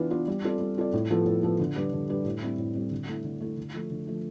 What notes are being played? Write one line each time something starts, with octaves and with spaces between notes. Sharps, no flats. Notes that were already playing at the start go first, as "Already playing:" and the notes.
Already playing: E3 B3 D4 F4 B4
B3 D4 F4 B4
G3
C4 F4 A4 D5
G3
C4 F4 A4 D5
A2
F3 B3 F4 A4
A2
F3 B3 F4 A4
D3
G3 D4 G4 B4
D3
G3 D4 G4 B4
A2
G3 C4 E4
A2
G3 C4 E4
D3
A3 E4
D3
A3 E4
D3
F3 A3
D3
F3 A3